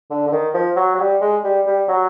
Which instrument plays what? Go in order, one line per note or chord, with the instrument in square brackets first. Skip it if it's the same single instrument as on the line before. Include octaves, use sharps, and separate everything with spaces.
[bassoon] D3
D3
D#3
F3
F#3
F#3
G3
G#3
G3
G3
F#3